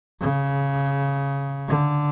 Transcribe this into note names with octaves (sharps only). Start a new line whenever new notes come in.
C#3
D3